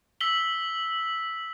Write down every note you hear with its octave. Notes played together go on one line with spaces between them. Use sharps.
E6 B6 F#7 G7